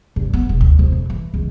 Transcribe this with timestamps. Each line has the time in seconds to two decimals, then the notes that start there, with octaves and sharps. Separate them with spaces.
0.16 G2
0.33 B3
0.49 E1
0.61 D2
0.79 F2
0.92 A2
1.10 E3
1.34 C#2